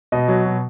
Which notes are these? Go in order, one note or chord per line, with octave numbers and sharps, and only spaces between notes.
B2 D#5
F#3
B2